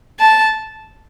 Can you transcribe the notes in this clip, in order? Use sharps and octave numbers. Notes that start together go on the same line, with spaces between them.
A5